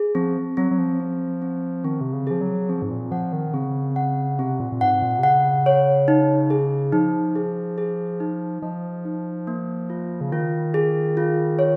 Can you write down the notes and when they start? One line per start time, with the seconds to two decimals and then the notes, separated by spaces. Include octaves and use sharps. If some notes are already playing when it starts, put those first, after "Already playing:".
Already playing: G#4
0.15 F3 C4
0.57 F#3 C4
0.71 F#3
0.78 F3
1.00 C4
1.42 C4
1.84 D#3 C4
2.01 C3
2.13 C#3
2.27 F3 G#4
2.41 F#3
2.69 F3 C4
2.82 G#2
2.91 A#2
3.11 F3 F#5
3.33 D#3
3.54 C#3 C4
3.96 F#5
4.39 C3 C4
4.60 A#2
4.72 A#2
4.81 G#2 F#5
5.02 A#2
5.19 C3
5.23 C#3 F#5
5.66 C#5
6.08 D#4
6.50 G#4
6.92 F3 D#4
7.35 G#4
7.78 G#4
8.20 D#4
8.62 F3 D#5
9.05 D#4
9.47 A#3
9.90 F4
10.21 C#3
10.32 D#3 F4
10.74 G#4
11.17 F4
11.59 C#5